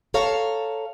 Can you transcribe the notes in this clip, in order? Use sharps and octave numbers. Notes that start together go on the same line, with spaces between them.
A4 C#5 F5 A#5